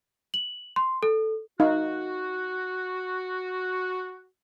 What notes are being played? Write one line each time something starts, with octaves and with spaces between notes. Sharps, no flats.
F#7
C6
A4
D#4 F#4 F5